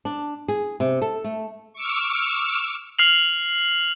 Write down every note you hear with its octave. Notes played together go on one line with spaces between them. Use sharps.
D4
G#4
C3
A4
A3
C#6 D6 E6 F6
F6 C7 F7 F#7